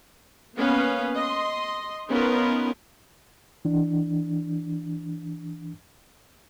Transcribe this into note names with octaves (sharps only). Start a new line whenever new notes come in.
A#3 B3 C#4 B4 F5
D#5 C6
B3 C#4 D#4 F4 A#4 B4
E3 D4